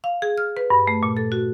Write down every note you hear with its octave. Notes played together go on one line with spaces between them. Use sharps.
F5
G#4
F6
B4
G2
A3
A#2
A4
F#4